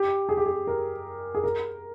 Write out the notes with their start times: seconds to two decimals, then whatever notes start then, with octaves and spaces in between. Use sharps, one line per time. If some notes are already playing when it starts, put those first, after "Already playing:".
Already playing: G4
0.29 G#4
0.37 G4
0.46 G#4
0.67 A#4
1.35 G#4
1.44 A#4